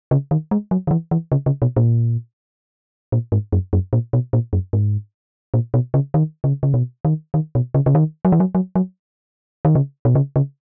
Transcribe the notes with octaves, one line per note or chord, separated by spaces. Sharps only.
C#3
D#3
G#3
F#3
D#3
E3
E3
C#3
C#3
B2
A#2
A#2
G#2
F#2
F#2
A#2
B2
A#2
F#2
G#2
A#2
B2
C#3
D#3
C#3
C#3
B2
D#3
D#3
B2
C#3
C#3
D#3
F#3
E3
F#3
F#3
F#3
D#3
C#3
B2
C#3
C#3